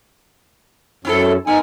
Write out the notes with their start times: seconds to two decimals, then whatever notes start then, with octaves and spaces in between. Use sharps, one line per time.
1.05 F#2 C4 E4 A4
1.47 B3 D#4 A#4 G#5